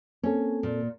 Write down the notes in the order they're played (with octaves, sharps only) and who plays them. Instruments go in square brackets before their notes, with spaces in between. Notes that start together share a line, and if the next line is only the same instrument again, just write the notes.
[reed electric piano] A#3 C4 A4 [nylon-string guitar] C#4
[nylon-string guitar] A#2